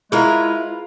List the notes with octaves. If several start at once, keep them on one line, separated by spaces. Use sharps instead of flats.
G#3 E4 F4 G#4 A#4 B4